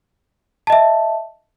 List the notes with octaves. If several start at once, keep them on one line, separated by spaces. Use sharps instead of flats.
D#5 E5 A5